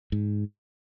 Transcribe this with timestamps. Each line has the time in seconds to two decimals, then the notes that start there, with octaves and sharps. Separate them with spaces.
0.12 G#2